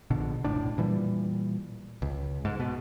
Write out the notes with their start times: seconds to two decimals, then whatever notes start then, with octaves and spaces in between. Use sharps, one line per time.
0.10 A#1 B2 D3
0.44 F1 C#2 A2 D4
0.78 A#2 E3 G3
2.02 C#2
2.45 G#2
2.60 B2